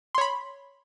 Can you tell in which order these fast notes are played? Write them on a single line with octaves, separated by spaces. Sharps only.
C6 C#5 B5